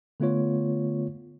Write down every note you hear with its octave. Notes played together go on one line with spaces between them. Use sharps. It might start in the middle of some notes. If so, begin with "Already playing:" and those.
D3 A3 B3 F4 C#5